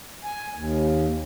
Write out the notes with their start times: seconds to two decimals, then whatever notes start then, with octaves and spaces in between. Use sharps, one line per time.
0.24 G#5
0.54 D#2